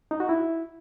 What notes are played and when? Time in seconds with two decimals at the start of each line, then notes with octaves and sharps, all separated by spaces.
0.11 D#4
0.20 F#4
0.29 E4